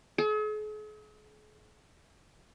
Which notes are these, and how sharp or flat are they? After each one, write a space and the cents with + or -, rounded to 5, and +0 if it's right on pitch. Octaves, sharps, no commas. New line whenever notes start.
G#4 +45